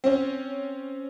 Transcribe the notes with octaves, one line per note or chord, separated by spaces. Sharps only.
C4 C#4